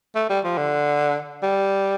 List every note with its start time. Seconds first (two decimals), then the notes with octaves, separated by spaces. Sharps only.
0.15 A3
0.29 G3
0.44 F3
0.57 D3
1.42 G3